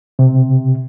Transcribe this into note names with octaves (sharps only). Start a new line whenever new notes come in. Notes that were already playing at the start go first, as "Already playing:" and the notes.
C3